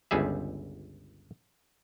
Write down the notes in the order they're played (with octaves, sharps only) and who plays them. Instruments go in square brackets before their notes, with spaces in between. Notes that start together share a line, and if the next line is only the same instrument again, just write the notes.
[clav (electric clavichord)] G1 C#2 G3 G#4 E5